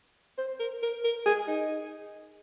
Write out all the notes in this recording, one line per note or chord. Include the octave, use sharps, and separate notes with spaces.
C5
A#4
A#4
A#4
G#4
D#4